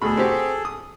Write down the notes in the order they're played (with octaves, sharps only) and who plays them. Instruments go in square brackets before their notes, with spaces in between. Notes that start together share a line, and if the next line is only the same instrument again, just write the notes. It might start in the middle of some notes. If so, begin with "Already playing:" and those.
[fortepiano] D2 B2 B5 [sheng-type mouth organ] G#4 A4
[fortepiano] C4 F#4 G4
D#6